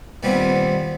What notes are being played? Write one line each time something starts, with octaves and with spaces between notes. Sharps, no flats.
A#2 D#3 G3 B3 C4